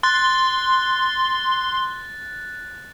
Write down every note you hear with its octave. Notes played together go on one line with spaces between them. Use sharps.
C6 F#6 A6